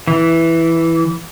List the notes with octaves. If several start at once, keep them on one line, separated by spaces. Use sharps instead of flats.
E3